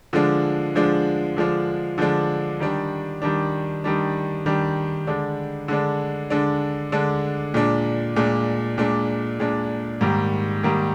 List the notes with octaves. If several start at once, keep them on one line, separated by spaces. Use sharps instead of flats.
D3 F3 G#3 D4
D3 F3 G#3 D4
D3 F3 G#3 D4
D3 F3 G#3 D4
D#3 G3 D4
D#3 G3 D4
D#3 G3 D4
D#3 G3 D4
D3 G#3 D4
D3 G#3 D4
D3 G#3 D4
D3 G#3 D4
A#2 G#3 D4
A#2 G#3 D4
A#2 G#3 D4
A#2 G#3 D4
G#2 D#3 G3 A#3
G#2 D#3 G3 A#3